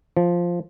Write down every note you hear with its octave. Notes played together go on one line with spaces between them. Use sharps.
F3